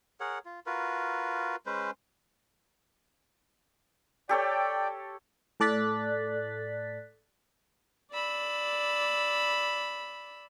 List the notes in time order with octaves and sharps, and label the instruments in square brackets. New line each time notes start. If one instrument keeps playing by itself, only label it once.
[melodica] G#4 A#4 C#5 F#5
F4
F4 F#4 A#4 B4
G#3 C#4 B4 C5
[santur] G4 A4 C#5 [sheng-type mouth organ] D5 G5
[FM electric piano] A2 A4 D5 F#6 A6 B6
[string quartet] D5 B5 E6